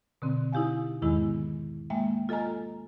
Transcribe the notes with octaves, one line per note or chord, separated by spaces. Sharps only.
B2 D3 C4
D#4 E4 G4 F5 G#5
E2 G#2 D#3 G#3 B3 E4
G#3 A#3 E5 G5
F4 A4 D#5 G#5 A#5